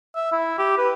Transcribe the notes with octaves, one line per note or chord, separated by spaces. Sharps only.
E5
E4
G4
B4